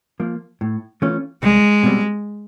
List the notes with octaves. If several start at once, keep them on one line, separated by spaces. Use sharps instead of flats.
F3 A#3
A2
E3 A3 C#4 F4
C2 G#3
B2 G3 C4